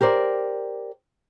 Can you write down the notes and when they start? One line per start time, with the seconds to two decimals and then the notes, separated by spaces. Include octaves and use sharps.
0.01 G4 A#4 C5 D5